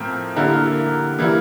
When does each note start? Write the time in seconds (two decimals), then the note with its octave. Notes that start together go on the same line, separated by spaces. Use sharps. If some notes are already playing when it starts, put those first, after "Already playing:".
Already playing: A2 F3 C4 A#4
0.36 D3 G3 A#3 E4 A#4
1.19 E3 G3 A#3 E4